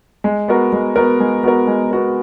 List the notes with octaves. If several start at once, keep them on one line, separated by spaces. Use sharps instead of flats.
G#3
B3 F#4 A#4
G#3
B3 F#4 A#4
G#3
B3 F#4 A#4
G#3
B3 F#4 A#4